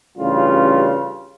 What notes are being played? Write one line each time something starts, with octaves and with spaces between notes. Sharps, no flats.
A1 G2 C#3 G3 F4